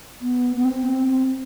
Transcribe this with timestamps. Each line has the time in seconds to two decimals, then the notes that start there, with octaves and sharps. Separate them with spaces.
0.21 B3
0.56 B3
0.65 C4